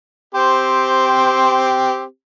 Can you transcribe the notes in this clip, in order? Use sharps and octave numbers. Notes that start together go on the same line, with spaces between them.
C4 G4 C5